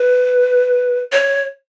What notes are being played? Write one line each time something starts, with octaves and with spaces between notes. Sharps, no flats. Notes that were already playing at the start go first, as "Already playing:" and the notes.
Already playing: B4
C#5